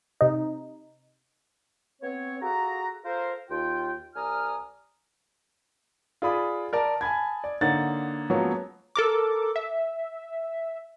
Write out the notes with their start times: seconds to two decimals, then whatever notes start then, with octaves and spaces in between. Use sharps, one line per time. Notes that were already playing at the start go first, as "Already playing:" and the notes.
0.21 C3 D#4
2.02 B3 C4 C#5
2.42 F4 F#4 G#4 A4 F#5 A#5
3.04 F4 A4 A#4 C5
3.49 D#2 F4 G5
4.15 C2 D5 G#5 A#5 D#6 F6
6.22 F4 G#4 D5 B5 D#6
6.73 A#4 D5 A5
7.01 G#5 A5 B5 G#6
7.44 D5
7.61 D3 A#3 D#4 C#5 F#5 A6
8.30 F3 F#3 G#3 A#3 B3 C#4
8.95 A4 A#4 D6
9.56 E5